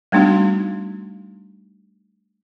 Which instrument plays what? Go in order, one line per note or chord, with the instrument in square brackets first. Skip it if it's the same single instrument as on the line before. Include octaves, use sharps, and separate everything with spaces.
[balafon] G3 A3 B3 D4 D#4 F#4